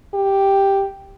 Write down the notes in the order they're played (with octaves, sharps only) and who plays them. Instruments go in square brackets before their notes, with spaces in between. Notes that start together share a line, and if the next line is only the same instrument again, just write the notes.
[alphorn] G4